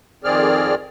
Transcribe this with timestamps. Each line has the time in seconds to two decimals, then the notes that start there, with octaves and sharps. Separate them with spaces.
0.24 F2 D#3 C4 G#4 D5 F6